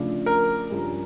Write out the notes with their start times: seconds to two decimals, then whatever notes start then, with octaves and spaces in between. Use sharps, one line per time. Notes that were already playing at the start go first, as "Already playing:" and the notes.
Already playing: C#3 F3 A3 D4
0.26 A#4
0.70 G2 F3 C#4 G4 A#4